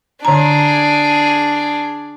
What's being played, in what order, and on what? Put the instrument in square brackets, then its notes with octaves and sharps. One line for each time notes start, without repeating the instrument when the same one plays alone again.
[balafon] D3 A#5 [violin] D4 G#4